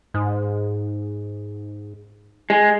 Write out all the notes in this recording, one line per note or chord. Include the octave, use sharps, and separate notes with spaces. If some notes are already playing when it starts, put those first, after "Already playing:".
G#2
G#3